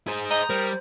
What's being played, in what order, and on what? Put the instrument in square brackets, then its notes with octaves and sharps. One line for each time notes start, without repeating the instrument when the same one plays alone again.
[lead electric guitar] G#4 C5
[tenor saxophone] D#5 [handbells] A#5 D#6 G6
[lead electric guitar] G3 [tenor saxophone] A#4 [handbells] C5